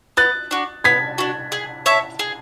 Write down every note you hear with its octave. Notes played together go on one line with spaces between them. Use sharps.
B3 F#6 A6
D4 F#4
B3 G#6 B6
D4 F#4
G#4
C#5 E5 A5
G#4